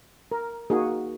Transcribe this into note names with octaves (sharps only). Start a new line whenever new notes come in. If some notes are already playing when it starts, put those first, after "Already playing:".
A#4
A#3 D#4 F#4 G#4